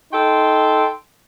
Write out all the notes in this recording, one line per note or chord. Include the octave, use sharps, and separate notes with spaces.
D#4 A4 G5 C6